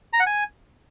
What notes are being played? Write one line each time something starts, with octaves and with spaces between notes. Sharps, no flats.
A#5
F#5
G#5